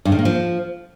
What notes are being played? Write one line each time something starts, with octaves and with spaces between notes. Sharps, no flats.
G2
D#3
A#3
F3